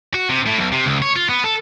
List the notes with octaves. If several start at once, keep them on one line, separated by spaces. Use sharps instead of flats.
F#4
C3
A2
B1
C3
C#2
C#5
F4
B3
A4